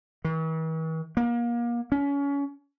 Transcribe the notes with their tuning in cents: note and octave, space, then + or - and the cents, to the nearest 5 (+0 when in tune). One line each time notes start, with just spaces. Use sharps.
E3 -45
A#3 +30
C#4 +30